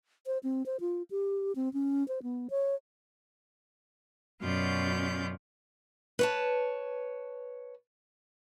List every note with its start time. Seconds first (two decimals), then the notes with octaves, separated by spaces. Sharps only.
0.27 C5
0.43 C4
0.66 C5
0.80 F4
1.11 G4
1.56 C4
1.73 C#4
2.08 C5
2.23 B3
2.50 C#5
4.41 F#2 B2 C#4 F4 D5 G6
6.19 B4 C#5 A5